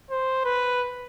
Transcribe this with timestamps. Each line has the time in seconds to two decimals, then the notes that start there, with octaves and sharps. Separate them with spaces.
0.11 C5
0.45 B4